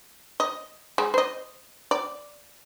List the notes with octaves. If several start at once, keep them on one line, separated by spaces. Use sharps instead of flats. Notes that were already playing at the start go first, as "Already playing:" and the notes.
D#5
G#3
C5 D#5
D5